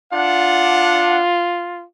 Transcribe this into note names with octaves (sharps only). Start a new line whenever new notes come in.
D4 F4 F#5